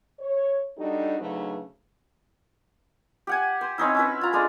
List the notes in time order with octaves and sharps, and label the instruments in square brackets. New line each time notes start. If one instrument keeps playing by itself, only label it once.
[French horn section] C#5
G3 D4 D#4 F#4 G4 A4
D2 C#3 F#3 A3 D#4 B4
[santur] G4 F#5 G#5
C5
C4 C#4 D#4 E4
C#4 E4 B4
F4 A#5
G#3 A3 D4 F5